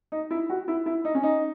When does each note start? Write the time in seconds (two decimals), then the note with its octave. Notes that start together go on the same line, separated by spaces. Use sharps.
0.12 D#4
0.31 E4
0.50 F#4
0.68 E4
0.86 E4
1.05 D#4
1.15 C#4
1.23 D#4